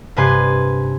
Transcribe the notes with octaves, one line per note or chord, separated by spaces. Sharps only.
G2 C3 B4 G#5 C6